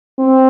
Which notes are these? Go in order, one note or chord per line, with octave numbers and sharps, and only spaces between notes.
C4